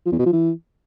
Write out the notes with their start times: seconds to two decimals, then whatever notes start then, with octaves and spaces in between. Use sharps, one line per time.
0.06 F3
0.12 E2
0.19 B2
0.26 F3
0.33 E3